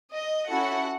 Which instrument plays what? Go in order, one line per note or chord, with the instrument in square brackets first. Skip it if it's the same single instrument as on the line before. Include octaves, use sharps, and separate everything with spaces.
[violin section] D#5
C#4 E4 F#4 A4 F#5